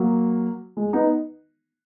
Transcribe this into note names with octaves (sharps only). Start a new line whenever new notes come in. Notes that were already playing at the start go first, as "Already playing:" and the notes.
Already playing: F#3 A#3
G#3
B3 D#4